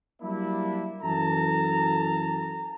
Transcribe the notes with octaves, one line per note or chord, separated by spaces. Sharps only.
F#3 G3 A#3 D4 E4
F#2 E3 A4 A5 A#5